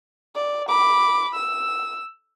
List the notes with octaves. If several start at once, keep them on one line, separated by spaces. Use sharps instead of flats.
D5
B5 D6
E6